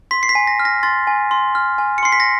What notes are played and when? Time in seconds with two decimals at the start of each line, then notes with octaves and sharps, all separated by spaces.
0.11 C6 B6
0.23 C7
0.29 B6
0.35 G#5
0.47 A#6
0.59 F6
0.65 A#6
0.83 C6 A6
1.07 G#5
1.31 C6
1.55 F6
1.78 G#5
1.98 C#7
2.03 C6 C7
2.12 B6
2.20 A#6